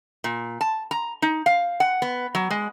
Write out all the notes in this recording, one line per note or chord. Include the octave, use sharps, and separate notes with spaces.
A#2
A5
A#5
D#4
F5
F#5
B3
F#3
G#3